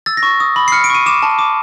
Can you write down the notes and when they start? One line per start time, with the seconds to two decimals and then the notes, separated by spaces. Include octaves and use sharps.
0.06 E6 A6
0.17 A#6
0.23 C#6
0.40 D#6
0.56 B5
0.68 C7
0.72 F6 C#7
0.84 D7
0.90 C#6 D#7
1.06 D6 E7
1.23 A5
1.39 D6